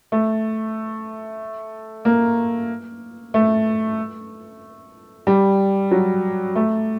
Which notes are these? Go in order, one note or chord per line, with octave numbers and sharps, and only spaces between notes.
A3
A#3
A3
G3
F#3
A3